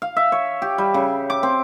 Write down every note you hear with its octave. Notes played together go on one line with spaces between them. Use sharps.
F5
E5
C#5
G4
G3
C#3
D6
C4